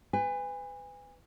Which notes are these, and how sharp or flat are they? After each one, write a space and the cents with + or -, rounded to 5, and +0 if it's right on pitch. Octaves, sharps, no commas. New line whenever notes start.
B4 +25 G#5 -30